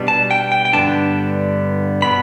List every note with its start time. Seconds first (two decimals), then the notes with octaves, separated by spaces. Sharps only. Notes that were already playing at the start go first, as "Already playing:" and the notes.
Already playing: B2 G3 B3 D4
0.08 A5
0.31 G5
0.52 G5
0.65 G5
0.73 G2 D3 G3 B3 D4 A5
2.02 B2 B3 B5